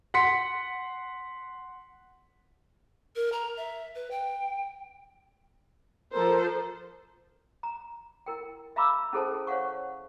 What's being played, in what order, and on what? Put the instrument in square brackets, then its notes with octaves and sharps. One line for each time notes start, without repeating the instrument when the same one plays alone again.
[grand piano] F#5 C6 B6 C#7
[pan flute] A#4
A#5
E5
B4
G5
[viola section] F3 A4 C5 [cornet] A#4
[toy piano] A#5
E4 A#4 G5
E5 F5 A#5 B5 D6 E6
C#4 E4 G#4 A4 C5 A5
C5 C#5 F5 F#5 C#6